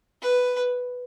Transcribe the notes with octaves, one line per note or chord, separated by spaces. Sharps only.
B4